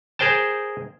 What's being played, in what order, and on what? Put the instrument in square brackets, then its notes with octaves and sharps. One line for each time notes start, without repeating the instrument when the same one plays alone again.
[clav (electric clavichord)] G#4 A#4 C5 G5 A5